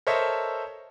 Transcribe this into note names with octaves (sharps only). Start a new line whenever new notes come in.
A4 A#4 C5 C#5 D#5 E5